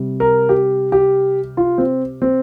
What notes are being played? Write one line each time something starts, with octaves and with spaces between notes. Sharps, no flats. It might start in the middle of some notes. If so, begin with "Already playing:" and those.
Already playing: C3 G3
A#4
G4
G4
F4
C4
C4